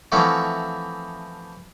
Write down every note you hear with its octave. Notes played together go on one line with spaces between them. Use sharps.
E3 F3 A3 C4 C#4 F#4